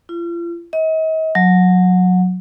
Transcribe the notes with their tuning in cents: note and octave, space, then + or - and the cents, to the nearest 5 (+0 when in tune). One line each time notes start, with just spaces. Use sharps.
F4 -40
D#5 +40
F#3 -20